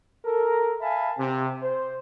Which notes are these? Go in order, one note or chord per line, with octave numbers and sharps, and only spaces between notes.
A4 A#4
E5 F5 G#5 A5 B5
C3
C5